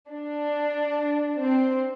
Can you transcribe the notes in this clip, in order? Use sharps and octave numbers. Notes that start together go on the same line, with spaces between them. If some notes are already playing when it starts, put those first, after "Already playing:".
D4
C4